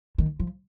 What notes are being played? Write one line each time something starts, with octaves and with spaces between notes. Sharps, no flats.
D#3
F3